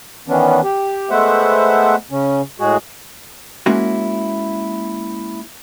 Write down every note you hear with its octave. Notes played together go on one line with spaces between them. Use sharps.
D#3 E3 B3 C#4 D4
G4
G#3 A3 B3 C5 E5 F#5
C#3 C#4
A2 G#3 F#4 G#4
G#3 A#3 C#4 E4 F#4